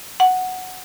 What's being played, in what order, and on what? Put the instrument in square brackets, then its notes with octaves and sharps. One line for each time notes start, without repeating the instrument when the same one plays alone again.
[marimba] F#5